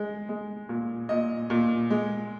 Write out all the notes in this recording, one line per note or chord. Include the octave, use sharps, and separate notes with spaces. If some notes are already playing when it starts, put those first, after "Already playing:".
Already playing: G#3
G#3
A#2
A#2 D#5
A#2
G#3